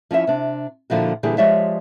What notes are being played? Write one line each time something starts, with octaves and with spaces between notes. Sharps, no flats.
F3 C#4 E4 E5
C3 D4
A#2 D3 F3 E4 F#4
A#2 D3 E3 G3 G4 G#4
F3 G#3 G4 C#5 D5 E5